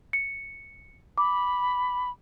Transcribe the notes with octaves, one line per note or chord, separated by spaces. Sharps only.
C#7
B5 D6